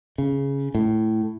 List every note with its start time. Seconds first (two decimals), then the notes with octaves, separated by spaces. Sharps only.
0.18 C#3
0.75 A2